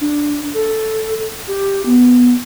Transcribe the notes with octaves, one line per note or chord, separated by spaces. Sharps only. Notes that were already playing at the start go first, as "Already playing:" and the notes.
D4
A4
G4
B3